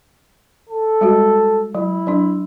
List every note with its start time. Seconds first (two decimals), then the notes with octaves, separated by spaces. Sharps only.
0.69 A4
1.01 G3 G#3 F#4
1.75 F#3 E4
2.07 F#3 D4